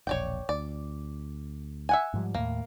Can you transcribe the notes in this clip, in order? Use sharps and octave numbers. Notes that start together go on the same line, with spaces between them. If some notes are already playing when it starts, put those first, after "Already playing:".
E1 A#1 C#5 D5 G5
D2 D5
E5 F#5 G#5
G#2 F3 G3
D#2 A2 A#3